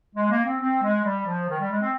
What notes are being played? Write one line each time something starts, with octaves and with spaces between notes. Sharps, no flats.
G#3
A#3
C4
C4
G#3
G3
F3
D#3
G3
G#3
C4